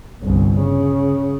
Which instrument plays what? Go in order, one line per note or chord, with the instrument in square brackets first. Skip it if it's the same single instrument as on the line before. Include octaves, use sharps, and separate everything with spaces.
[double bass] G1 C2
C#3